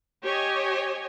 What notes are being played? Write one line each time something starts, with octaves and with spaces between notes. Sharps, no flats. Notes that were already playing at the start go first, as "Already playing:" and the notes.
G4 C#5 D#5 G#5